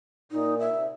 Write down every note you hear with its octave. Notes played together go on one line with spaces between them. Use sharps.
A#2 D#4
E5
C3